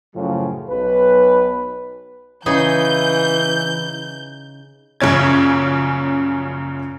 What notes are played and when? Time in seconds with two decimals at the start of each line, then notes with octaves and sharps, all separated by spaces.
0.16 F#2 A2 C#3 F3 F#3
0.71 B1 B4
2.46 C#3 E3 D#4 G#4 G6
5.00 A#1 F#2 C#3 C#4 G#6